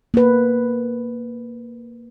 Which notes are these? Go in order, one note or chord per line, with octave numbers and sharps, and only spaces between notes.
A#3 B4